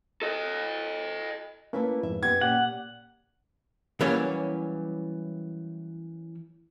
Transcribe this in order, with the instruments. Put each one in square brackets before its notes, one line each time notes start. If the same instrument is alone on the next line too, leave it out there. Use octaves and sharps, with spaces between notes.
[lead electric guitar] A4 D#5
[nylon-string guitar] A3 E4 B4 [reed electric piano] A#3 C#4
[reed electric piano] F2 G#2 [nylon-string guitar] E5
[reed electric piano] F#2 G4 [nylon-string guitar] B3 F#5 [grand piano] G#6
[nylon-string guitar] A#2 [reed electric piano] C#4 G4 [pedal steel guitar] F#5
[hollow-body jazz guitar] E3 F#3 G3 A#3 C#4